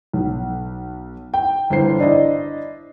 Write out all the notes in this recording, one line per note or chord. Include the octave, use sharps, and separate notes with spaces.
B1
G5
G1 E3 C5 C7
D4 E4 C5 D#5